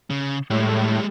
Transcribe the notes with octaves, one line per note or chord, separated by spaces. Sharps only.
C#3
A2 G3 G#3